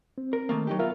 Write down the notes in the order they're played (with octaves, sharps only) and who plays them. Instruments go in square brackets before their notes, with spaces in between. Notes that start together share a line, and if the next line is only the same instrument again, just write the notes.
[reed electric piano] C4
[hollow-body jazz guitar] A#4
D#3 A3 A#3
F#3 D#4 G4
[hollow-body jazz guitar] B3 F4 F5 [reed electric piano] A#4 E5